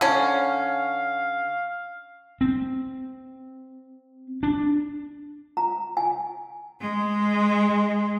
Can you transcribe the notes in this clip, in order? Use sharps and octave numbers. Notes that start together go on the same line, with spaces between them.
D3 C#4 F5
C4
D4
A#5
G#5
G#3